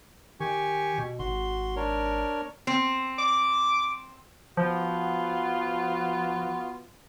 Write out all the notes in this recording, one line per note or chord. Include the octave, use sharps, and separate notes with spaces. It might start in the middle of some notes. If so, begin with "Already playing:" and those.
D#3 G4 G#5 C#6
B2
G#1 F#4 C6
D4 A#4 C#5
C4
D6
F3 B3 F4 F#4